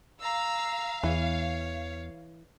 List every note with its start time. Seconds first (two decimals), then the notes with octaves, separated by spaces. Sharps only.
0.21 F5 A#5 E6
1.03 E2 E3 C#5